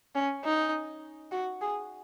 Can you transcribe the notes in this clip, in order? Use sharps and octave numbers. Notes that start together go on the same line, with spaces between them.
C#4
D#4
F#4
G#4